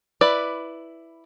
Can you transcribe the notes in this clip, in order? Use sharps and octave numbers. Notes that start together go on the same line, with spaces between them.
E4 B4 D5